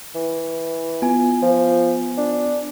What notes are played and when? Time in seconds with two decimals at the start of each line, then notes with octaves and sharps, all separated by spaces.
0.15 E3
1.02 B3 F4 G#5
1.42 F3
2.17 D4